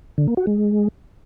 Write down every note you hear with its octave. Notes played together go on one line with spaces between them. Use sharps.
D3
A#3
F#4
G#3